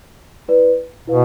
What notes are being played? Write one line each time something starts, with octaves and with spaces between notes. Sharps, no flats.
E4 B4 D5
B2 E4 B4 F5